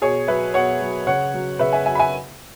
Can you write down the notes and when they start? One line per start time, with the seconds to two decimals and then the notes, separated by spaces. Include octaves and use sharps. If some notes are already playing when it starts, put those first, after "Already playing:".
0.01 B2 G#4 C#5
0.28 F#3 B4 E5
0.54 B2 C#5 F#5
0.81 F#3
1.07 C#3 C#5 F#5
1.34 F#3
1.59 C#3 B4 E5
1.73 E5 G#5
1.86 F#3 E5 G#5
1.95 B5
1.99 E5 G#5